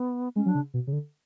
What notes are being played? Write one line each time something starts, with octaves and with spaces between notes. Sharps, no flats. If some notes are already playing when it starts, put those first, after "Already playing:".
Already playing: B3
G#3 C#4
F#3
D4
C#3
B2
C#3
D3